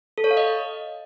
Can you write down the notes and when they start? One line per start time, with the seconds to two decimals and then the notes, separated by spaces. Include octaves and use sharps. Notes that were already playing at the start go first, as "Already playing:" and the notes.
0.18 A4
0.24 C#5
0.31 F5
0.37 D#5